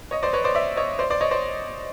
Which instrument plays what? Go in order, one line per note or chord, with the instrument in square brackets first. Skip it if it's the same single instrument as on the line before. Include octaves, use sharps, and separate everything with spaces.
[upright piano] C#5 D#5
C5 D5
B4 C#5
C5 D5
D5 E5
C#5 D#5
C5 D5
C5 D5
C#5 D#5
C5 D5